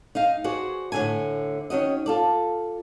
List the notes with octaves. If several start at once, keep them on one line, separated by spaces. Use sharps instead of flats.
D#4 D#5 F5
F#4 G#4 C5 D5
A2 D3 G#5
D#3 C#4 F#4 D#5
F4 A4 D5